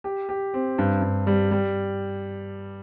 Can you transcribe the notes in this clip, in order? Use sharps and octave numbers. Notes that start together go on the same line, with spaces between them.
G4
G4
C4
G2
G2
G3
G3